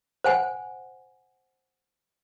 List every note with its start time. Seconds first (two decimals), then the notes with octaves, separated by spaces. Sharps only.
0.24 C5 F#5 G#5